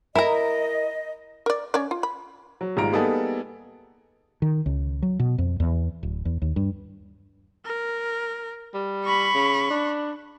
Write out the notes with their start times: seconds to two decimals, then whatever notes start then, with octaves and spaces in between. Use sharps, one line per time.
0.15 E4 A#4 D#5 A#5
1.46 A#4 D5
1.74 C#4 C#5 D5
1.91 F4
2.03 B5
2.61 F#3
2.77 G#1 G3 G#3 F4 A#5 D7
2.93 G3 A#3 B3 D#4 G#4 A4
4.42 D#3
4.66 C#2
5.02 F#3
5.19 B2
5.38 F2
5.60 E2
6.03 D1
6.25 E2
6.42 D#2
6.56 G2
7.65 A#4
8.74 G3
9.04 B5 C#6
9.35 C#3
9.70 D4